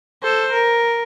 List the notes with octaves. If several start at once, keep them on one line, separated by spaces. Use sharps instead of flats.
A4 C5
A#4